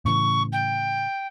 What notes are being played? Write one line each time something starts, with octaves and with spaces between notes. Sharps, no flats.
A2 C#3 E3 C#6
G5